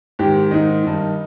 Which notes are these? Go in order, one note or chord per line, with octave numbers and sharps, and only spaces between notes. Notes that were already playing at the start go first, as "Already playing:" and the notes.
G#2 D#3 G4
G#2 D#3 D#4
G2 D#3